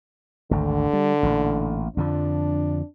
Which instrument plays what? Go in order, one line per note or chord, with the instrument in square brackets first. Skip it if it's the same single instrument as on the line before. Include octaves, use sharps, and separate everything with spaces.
[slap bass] G#1 D2 [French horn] D3
[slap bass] G3
A1 A#2
[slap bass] F2 D3 F3 [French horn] D4